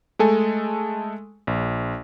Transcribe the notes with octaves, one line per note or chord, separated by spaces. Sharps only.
G#3 A3 A4 G#5
A#1